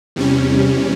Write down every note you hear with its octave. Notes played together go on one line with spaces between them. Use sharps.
E2 C3 G3 C#4